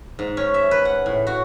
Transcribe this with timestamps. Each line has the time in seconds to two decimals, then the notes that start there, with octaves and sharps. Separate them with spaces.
0.19 G#2
0.37 C#4
0.54 E5
0.71 B4
0.85 F#5
1.06 A2
1.27 F#4